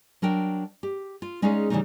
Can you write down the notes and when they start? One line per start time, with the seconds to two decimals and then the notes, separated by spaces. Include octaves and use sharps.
0.22 F#3 D4 A#4 G5
0.83 G4
1.22 F4
1.42 G#3 C#4 D#4 G#4 D5 F5
1.70 C#3 E3 G3 A#3 C#4 D#4